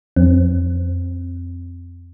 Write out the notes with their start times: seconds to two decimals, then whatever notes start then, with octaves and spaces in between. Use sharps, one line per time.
0.16 F2 C4